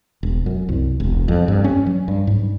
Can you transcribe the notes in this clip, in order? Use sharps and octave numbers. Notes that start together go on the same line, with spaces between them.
E1
F#2
C2
E1
F2
G2
C#4
F#3
G2
G#2